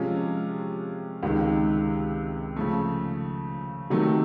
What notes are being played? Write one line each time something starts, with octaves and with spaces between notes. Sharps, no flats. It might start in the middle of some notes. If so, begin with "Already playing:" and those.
Already playing: C3 F3 G#3 C#4 F4
C#2 C3 D#3 G#3
C#3 F3 A3
C3 D#3 F#3 A3